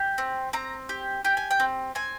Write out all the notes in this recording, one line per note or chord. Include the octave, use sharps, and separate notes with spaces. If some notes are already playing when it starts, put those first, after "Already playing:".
Already playing: G4
C4
C4 A#5
G4
G4 G5
G#5
G5
C4
C4 G#5